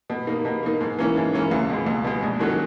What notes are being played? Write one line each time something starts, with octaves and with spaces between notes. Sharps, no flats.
B2
A#3 D#4
B2
A#3 D#4
G#2
E3 A#3 C#4 E4
G#2
E3 A#3 C#4 E4
C#2
B2 G#3
C#2
B2 G#3
A#1
G#2 D#3 F#3 C#4